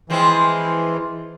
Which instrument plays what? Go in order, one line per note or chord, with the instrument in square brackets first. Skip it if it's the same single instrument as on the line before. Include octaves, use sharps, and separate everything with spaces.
[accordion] E3 [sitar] F3 G#3 C4